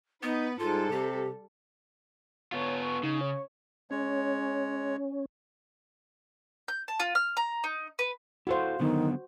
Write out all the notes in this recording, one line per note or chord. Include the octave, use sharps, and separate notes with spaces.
B3 D#4 B4
G#2 G3 F4 A4
C3 G4
B3 F4 C#5
C#6
C#3 D#4
C#5
G#3 C#4 C#5
G6
A5
F4
F6
A#5
D#4
B4
E4 F#4 A4 C5 F5
D3 D#3 F#3 B3